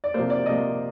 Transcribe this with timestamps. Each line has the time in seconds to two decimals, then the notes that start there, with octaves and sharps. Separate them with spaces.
0.04 D5
0.14 C3 F3 A#3 C5
0.30 D5
0.46 C3 F3 A#3 D#5